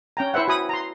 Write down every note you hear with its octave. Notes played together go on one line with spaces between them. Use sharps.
C#4 G5 A#5
E4 B4 C5 E5 F#5
F#4 G#5 B5 D#6
A#5 C6